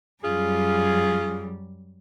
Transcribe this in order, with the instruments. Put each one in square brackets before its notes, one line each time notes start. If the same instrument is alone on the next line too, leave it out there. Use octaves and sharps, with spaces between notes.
[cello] F#2 G3 [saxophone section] C#4 F4 G#4